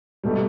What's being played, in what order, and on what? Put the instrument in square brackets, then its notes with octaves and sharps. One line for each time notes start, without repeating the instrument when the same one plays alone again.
[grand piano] B2 A3 D#4 [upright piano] G3